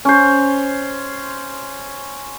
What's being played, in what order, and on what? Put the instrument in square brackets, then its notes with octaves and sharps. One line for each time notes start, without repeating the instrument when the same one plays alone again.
[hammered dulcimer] C#4 C5